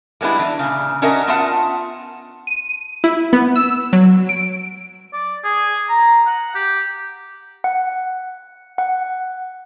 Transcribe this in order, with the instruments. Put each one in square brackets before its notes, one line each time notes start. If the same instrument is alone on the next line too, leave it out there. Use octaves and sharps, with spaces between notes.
[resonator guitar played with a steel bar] G3 G#3 B3 D4 E4
E3 D4
A#2 C#3
C#4 D4 F#4 A#4 D#5 E5
B3 F4 E5 F#5 A5
[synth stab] D#7
E4
B3
E6
F#3
D7
[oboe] D5
G#4
A#5
F#5
G4
[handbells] F#5
F#5